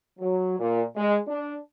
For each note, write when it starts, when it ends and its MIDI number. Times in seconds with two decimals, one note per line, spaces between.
0.20 0.56 54
0.59 0.82 46
0.97 1.16 56
1.27 1.55 62